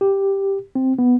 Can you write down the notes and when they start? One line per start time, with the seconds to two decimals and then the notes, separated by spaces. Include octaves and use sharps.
0.01 G4
0.75 C4
0.99 B3